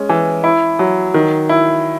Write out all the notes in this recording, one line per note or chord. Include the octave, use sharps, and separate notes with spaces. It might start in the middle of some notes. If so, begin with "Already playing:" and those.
Already playing: G#3 C#4
E3
E4
F#3
D#3
E4